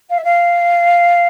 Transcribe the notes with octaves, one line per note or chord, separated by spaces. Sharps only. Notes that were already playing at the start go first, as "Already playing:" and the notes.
F5
E5
F5